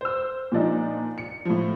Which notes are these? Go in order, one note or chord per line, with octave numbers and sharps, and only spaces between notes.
C5 E6
A#2 F3 D4 D#4
C#7
A2 F3